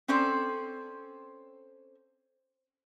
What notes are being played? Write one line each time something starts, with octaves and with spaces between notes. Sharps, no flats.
C4 C#4 A4 C5 D5